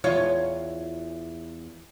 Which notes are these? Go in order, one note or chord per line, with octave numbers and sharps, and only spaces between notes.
E2 F4 C#5